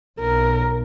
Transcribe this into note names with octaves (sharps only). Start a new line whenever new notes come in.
B1 A#4